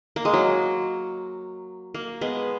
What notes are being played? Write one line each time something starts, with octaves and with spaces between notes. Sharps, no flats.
A#3
G#3
F#3
A#3
G#3 B3